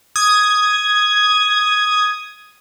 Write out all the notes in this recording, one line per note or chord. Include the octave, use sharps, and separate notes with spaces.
D#6 G#6